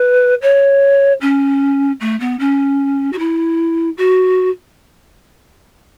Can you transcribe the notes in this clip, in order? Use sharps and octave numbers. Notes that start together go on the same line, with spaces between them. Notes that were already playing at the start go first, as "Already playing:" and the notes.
Already playing: B4
C#5
C#4
A3
B3
C#4
F#4
E4
F#4